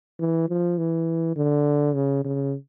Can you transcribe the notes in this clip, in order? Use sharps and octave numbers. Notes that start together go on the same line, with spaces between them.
E3
F3
E3
D3
C#3
C#3